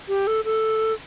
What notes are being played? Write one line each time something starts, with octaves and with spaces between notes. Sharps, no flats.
G4
A4
A4